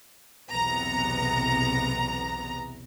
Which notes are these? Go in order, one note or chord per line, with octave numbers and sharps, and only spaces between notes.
B1 E2 C3 B3 A#5